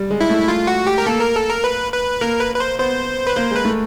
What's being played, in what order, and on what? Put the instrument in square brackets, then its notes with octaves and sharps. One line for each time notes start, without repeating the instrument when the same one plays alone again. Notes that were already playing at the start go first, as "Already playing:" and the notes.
Already playing: [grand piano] G3
G#3
[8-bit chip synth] E4
[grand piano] A3
[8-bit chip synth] F4
F#4
G4
A#4
[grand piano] A#3 [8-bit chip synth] A4
[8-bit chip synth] A#4
A4
A#4
B4
B4
[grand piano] A#3 [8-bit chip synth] A#4
[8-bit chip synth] B4
B4
C5
[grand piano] B3 [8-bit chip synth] C5
[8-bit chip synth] B4
[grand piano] A#3 [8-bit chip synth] C5
[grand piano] G#3 [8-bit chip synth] B4
[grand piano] A3